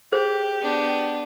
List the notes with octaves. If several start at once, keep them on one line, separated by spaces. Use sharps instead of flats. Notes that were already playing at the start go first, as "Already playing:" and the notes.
G4 G#4 C5
B3 D4